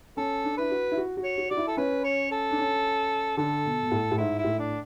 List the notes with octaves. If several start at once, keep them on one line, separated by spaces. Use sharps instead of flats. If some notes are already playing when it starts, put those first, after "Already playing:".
C#4 A4
D4
E4 B4
F#4
E4
F#4
F#4
C#5
F#4
F#4 D5
E4
A4
C#4 B4
C#5
A4
D4
C#4
D3 A4
B2
B2
A2
A2
G#2 E4
E4
A2
D4